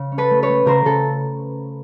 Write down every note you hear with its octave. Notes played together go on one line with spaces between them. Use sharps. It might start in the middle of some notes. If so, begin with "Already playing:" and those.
Already playing: C#3
C#4
A4 B4
A3
B4 C#5
A3
C#3 A#4 C5
C#3 A4